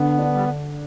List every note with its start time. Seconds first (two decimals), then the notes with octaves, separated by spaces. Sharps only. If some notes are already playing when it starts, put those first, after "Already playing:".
Already playing: D3 B3
0.19 D4
0.33 G3